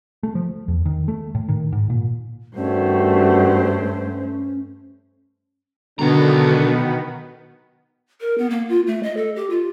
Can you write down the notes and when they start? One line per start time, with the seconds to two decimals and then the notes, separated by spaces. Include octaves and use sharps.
0.23 A3
0.35 F3
0.68 E2
0.85 D#3
1.08 A3
1.35 A2
1.48 D#3
1.72 G#2
1.90 A#2
2.57 G2 D#3 G3 A3 C#4 F#4 C5
5.99 B1 B2 D3 D#3 B3 F#4 A#5
8.21 A#4
8.38 B3
8.50 A#3
8.69 F4
8.87 A3
9.03 D#5
9.17 A4
9.36 G4
9.50 F4